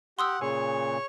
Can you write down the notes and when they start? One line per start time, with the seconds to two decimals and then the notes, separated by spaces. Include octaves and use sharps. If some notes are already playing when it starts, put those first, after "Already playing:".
0.19 G4 F#5 C6 D#6 E6
0.41 A#2 C#3 G#4 C#5 C#6